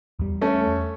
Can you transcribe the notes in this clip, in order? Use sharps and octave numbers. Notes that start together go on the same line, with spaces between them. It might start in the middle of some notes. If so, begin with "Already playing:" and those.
E2 G3
A3 C#4